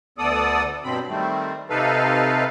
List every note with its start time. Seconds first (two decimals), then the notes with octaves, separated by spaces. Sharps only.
0.18 D2 B3 A4 D5 D#6
0.84 G2 B2 F#3 C4 B5
1.09 D#3 G3 A3 C4
1.70 C3 D#4 A4 B4 F5